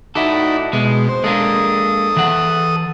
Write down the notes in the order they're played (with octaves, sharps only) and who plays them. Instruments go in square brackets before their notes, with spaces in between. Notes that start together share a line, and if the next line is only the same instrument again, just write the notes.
[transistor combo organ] D#4 F#4 D5 [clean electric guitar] E4 A4
[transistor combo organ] B2 [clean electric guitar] G#3
[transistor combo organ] C5
[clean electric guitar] G#3 A#3 D4 [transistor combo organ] A4 D#6
[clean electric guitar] E3 F#5